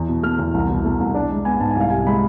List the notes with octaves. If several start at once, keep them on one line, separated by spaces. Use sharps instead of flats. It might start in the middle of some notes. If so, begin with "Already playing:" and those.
Already playing: E2
B2
A3 F6
E2
C2
B2
A3
C2
D4
G#3
B3 G#5
G#2 A5
G#5
C2 F5
C3 G#5
G#3 B5